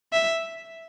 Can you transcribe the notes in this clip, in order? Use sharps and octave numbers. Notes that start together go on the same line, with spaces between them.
E5